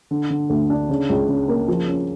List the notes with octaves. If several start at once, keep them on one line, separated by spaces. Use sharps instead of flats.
D3
D3
D2
D4
C#3
C#2
C#3
A#3
F3
C#4